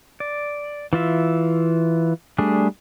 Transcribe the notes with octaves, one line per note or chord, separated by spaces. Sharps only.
D5
E3 F4 E5
G3 A3 D4 G#4